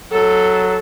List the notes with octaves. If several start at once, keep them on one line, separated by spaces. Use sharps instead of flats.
F#3 A4